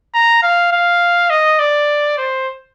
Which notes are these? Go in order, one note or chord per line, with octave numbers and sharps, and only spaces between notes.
A#5
F5
F5
D#5
D5
C5